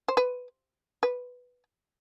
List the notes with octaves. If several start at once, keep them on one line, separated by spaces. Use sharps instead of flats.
C5
B4
B4